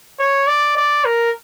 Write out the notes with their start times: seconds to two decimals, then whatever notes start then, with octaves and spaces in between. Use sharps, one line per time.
0.19 C#5
0.48 D5
0.76 D5
1.05 A#4